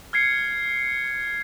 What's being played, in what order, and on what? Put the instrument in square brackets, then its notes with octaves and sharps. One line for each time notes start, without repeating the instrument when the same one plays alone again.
[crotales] F6 G#6 C7 C#7